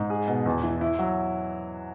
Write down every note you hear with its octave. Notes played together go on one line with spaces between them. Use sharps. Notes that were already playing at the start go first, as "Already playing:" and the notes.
Already playing: G#2
G#4
B2
E2
E3
E4
F#3